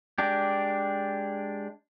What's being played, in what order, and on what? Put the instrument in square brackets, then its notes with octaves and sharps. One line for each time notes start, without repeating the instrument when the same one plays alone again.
[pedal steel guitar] G#3 D4 G4